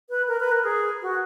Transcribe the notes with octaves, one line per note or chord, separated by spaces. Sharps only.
B4
A#4
B4
A#4
G#4
F#4